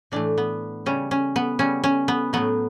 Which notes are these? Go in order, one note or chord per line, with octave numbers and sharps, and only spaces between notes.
A2 E3 A3 D4
B3
C#3 G3 C#4
C#4
B3
C#3 G3 C#4
C#4
B3
A2 F#3 A3 B3